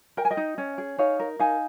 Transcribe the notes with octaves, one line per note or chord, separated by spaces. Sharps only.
A#4 G5
G#5
D#5 G5
D#4
C#4
G#4
D#4 C#5 F5
A#4
D#4 F5 G#5